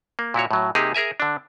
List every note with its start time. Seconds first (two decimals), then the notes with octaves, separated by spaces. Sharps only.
0.19 A#3
0.34 A#2 E4 F#4 C#5
0.51 A2 F#3
0.75 C3 A#3 D#4 G4 G#4
0.94 G#4 A#4 E5 G#5
1.20 D3 D4